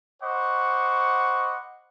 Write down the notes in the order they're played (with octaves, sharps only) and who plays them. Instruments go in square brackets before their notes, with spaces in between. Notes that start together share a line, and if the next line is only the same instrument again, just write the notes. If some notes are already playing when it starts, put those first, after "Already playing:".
[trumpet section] C5 D#5 F#5 B5 C#6 D6